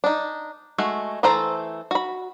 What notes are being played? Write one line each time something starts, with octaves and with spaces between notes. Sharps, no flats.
D4 D#4
G#3 A3 F#4
E3 A3 A4 C5 A#5
F#4 B5